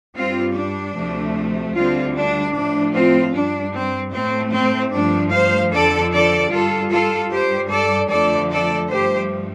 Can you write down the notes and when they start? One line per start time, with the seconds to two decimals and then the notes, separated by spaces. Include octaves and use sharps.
0.15 G2 G3 C4 F4
0.55 D4
0.95 D2 C3 F3 A3
1.75 D2 D3 G3 C4 F4
2.14 D4
2.54 A2 F3 A3 D4
2.94 C4 F4
3.33 G2 G3 D4
3.74 C4
4.13 A2 A3 C4
4.53 C4
4.93 G2 F3 A3 D4
5.32 C5 F5
5.72 F2 D3 F3 A4 D5
6.12 A4 D5
6.51 G2 G3 F4 A4
6.91 F4 A4
7.31 G2 G3 G4 C5
7.71 A4 D5
8.10 F2 D3 F3 A3 A4 D5
8.51 A4 D5
8.90 G2 F3 A3 G4 C5